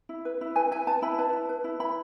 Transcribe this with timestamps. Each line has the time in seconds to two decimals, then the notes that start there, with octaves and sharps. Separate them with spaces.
0.09 E4
0.25 B4
0.41 E4
0.56 B4 G#5
0.71 E4 G#5
0.87 B4 A5
1.02 E4 B5
1.18 B4 A5
1.33 E4
1.49 B4
1.64 E4
1.80 E4 B5